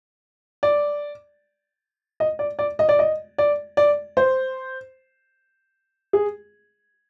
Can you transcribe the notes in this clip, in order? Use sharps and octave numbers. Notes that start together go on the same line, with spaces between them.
D5
D#5
D5
D5
D#5
D5
D#5
D5
D5
C5
G#4